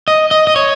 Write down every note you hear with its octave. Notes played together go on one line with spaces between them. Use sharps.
D#5
D#5
D#5
C#5